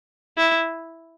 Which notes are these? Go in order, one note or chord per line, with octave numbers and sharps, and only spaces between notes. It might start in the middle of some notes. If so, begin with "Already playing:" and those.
E4